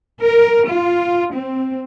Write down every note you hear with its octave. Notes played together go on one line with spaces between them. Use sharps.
A#4
F4
C4